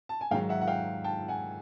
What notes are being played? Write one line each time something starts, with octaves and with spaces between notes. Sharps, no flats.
A5
G#5
G#2 D#3 F#3 F5 G5
E5 F#5
F#5
F5 G5
G5 A5
F#5 G#5